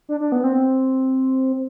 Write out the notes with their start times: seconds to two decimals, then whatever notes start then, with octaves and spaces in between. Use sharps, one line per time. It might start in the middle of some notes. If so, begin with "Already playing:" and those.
0.09 D4
0.20 D4
0.32 B3
0.44 C4